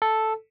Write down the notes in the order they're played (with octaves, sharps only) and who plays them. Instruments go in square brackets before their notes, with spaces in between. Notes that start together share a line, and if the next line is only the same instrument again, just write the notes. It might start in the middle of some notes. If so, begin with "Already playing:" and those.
[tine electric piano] A4